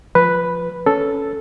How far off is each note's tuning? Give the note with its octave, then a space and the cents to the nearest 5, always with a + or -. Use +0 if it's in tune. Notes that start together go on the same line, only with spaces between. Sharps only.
F3 +0 B4 +0
C#4 +15 A4 +0